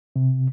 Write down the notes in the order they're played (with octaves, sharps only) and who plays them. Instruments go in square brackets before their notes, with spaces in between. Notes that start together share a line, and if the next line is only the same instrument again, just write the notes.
[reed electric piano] C3